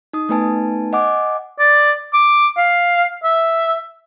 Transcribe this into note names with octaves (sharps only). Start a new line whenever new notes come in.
D#4 D#6
A3 B3 D#4 B4 G#5 A5
D#5 F#5 G#5 D6
D5
D6
F5
E5